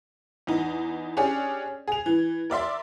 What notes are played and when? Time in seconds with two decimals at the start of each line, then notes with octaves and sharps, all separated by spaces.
0.47 E2 D#4
1.17 C#4 D4 G4 G#4
1.88 G#4 F7
2.06 E3
2.50 A#4 D5 E5 C6